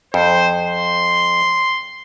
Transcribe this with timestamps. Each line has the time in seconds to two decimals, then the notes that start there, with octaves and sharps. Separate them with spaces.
0.14 F2 C5
0.63 C6